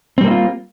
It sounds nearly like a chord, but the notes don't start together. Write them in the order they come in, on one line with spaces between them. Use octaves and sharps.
C4 G3 A#3 E4 F4